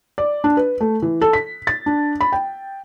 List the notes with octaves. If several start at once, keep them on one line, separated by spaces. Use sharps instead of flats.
D5
D4
B4
A3
E3
A4
B6
A6
D4
B5
G5